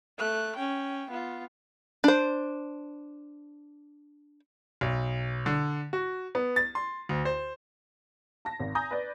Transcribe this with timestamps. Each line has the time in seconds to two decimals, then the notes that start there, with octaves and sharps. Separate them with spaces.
0.18 A3 F#6
0.56 C#4 G5
1.10 B3 F4
2.04 D4 C5
4.81 B1
5.46 D3
5.93 F#4
6.35 B3
6.56 A6
6.75 C6
7.09 D2
7.25 C5
8.45 A5 A#6
8.60 G#1
8.75 G#5 A#5 D#6 G6 A#6
8.91 B4 D5